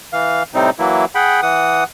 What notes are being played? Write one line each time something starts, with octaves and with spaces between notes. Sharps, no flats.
E3 F5
A2 C3 G3 C4 D#4
E3 F#3 A#3 E4
G#4 F#5 G5 B5
E3 F#5 D#6